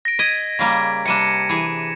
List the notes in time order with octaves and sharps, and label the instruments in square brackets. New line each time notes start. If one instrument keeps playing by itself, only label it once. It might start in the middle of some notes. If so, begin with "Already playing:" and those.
[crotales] A#6 D7
[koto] D#5 [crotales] G#6 B6
[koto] C#3 G3 A#3
[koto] C3 G3 D4 [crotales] C#7 D#7 E7
[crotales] C#7
[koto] E3 G#4